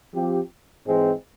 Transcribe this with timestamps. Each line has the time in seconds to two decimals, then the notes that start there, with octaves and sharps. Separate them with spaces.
0.14 F3 C4 G4
0.86 G#2 E3 G#3 C4